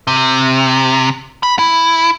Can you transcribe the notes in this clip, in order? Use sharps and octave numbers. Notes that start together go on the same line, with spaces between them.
C3
B5
E4